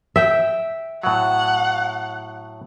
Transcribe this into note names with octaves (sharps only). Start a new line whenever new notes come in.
E5 G5
A2 F#3 F#5